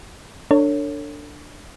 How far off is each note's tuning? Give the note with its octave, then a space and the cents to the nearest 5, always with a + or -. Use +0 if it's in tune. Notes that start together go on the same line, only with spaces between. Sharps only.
D4 +0 A4 +40 C#5 +0